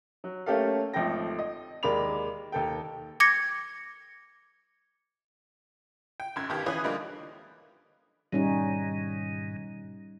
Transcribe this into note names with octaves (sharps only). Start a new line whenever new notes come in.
F#3
A3 A#3 C#4 G4 A4 F5
G#1 F3 A3 A4 G5 A#6
D#5
D#2 G#3 A#3 D5 B5 F7
D#2 A4 G5
D6 G#6 A#6 C#7
G5
F1 F#2 G#6
C#2 B2 D#3 G4
E3 C#4 G#4 B4 D#6 F#6
D3 F3 G3 G#3 A#3
G#2 B2 D#3 G3 C#4 D#4